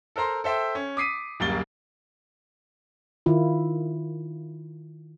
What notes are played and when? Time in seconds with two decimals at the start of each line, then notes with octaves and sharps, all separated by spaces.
0.16 A4 A#4 C5 A#5 C6
0.44 A4 C5 E5 G5
0.75 C#4
0.97 D6 D#6 B6 C7 D#7
1.40 D1 F#2 G3 A#3 A6 G7
3.26 D#3 E4 F4